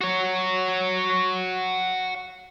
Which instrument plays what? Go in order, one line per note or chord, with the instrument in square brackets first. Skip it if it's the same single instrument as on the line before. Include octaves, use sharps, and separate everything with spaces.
[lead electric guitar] F#4 C#5